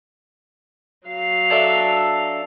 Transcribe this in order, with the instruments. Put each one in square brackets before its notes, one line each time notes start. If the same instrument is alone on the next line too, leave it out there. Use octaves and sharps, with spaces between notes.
[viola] F#3 F5
[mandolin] D4 A4 E5